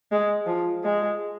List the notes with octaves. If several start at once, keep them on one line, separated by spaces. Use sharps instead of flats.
G#3
F3
G#3